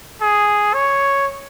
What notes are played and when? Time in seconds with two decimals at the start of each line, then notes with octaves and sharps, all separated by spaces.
0.21 G#4
0.74 C#5